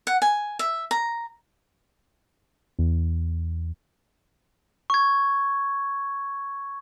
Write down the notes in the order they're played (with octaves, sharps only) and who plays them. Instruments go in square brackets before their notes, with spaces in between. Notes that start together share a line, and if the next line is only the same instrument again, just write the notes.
[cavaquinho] F#5
G#5
E5
A#5
[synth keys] E2
[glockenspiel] C#6 G#6